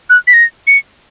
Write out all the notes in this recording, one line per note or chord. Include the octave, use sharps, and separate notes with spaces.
F#6
B6
A#6
C#7